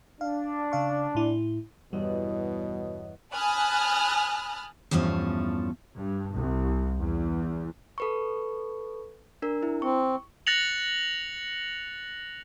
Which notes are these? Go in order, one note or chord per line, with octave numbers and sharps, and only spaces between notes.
D4 F5
C#3 F5 C#6
A2 E4
E2 G2 B2 G3 C#5 D#5 D#6
G#5 A5 B5 D#6 F6 F#6
E2 G2 F3 A3 C#4
G2
C2
E2
A4 B4 C#6
D4 A#4
E4
C4 C#6
F#6 A6 A#6 C#7 F7 F#7